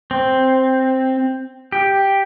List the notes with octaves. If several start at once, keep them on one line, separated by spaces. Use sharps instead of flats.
C4
G4